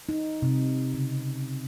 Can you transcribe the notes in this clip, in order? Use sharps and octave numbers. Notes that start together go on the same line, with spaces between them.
D#4
C3
C#3